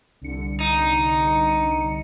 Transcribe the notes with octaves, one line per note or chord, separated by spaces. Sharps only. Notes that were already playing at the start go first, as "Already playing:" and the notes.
C2 D3 C#7
D#4